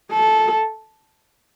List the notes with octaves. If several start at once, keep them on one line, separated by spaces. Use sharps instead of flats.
A4